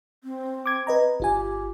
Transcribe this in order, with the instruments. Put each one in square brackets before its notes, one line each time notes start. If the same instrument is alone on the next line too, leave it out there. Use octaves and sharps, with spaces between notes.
[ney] C4
[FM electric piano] D6 G#6
B4 D#5 A#5
[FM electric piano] G1 F4 G#5 [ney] G4